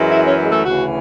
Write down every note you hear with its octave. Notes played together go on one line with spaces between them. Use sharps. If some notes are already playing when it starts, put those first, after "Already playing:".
Already playing: F#2 E3 G#3
E4
C#4
G#3
A3
D2 C#3 E3 F#4